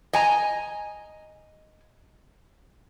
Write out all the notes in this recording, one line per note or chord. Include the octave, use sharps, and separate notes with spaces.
D#5 G#5 A#5